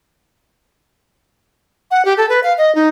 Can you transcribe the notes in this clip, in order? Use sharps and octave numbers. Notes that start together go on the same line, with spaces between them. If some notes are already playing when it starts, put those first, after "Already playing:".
F#5
G4
A4
B4
F5
D#5
D#4